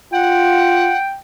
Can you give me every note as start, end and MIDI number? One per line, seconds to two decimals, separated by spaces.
0.13 0.92 65
0.13 0.98 78
0.13 1.18 79